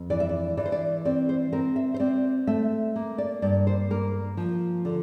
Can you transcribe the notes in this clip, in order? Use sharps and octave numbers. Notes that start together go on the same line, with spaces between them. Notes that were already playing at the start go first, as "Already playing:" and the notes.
Already playing: F2
E3 D5
E5
D5
E3 D5
C5
D5
C4 D5
C5
C4 A#4
E5
C5
C4 D5
A3 E5
A#3
D5
G2 D5
C5
A#3 A#4
F3
D3